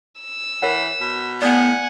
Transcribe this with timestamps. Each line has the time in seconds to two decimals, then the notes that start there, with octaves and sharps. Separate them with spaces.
0.21 E6
0.62 E3 A#4 C#5 F#5
1.00 B2
1.42 A2 B3 D5 F#5 G#5